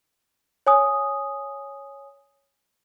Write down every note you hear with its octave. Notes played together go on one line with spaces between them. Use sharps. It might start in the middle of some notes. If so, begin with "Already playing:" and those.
C#5 G#5 D#6